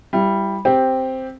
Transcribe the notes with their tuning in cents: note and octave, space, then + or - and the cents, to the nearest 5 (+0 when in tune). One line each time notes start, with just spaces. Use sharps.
G3 +0 E4 +25
C4 +0 G4 +0